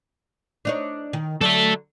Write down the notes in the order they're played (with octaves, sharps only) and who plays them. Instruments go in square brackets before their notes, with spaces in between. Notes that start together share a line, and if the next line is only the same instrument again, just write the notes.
[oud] D4 D#4 C#5
D#3
[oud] D3 F#3 [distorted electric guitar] A4 E5